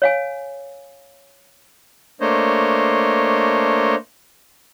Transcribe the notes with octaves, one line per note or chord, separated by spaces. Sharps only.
C#5 F5 G#5
A3 A#3 D4 C5 C#5 D#5